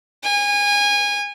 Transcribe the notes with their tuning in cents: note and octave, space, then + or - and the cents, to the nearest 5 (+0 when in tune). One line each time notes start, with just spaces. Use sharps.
G#5 -25